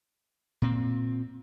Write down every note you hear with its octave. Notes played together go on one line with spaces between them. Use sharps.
A#2 C4